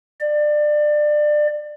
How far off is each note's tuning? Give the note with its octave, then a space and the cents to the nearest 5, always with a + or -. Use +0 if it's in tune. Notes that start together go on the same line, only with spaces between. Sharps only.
D5 +25